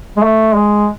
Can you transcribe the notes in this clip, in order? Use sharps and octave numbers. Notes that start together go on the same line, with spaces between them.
G#3
A3
G#3